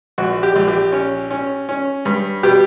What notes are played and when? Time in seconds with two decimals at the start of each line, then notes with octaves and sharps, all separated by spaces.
0.18 A#1 F#4
0.43 G4
0.56 A#1
0.68 G4
0.92 C#4
1.31 C#4
1.69 C#4
2.05 G2
2.43 B2 G4